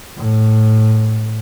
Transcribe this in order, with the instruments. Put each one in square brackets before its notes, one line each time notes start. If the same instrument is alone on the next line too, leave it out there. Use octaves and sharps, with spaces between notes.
[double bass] A2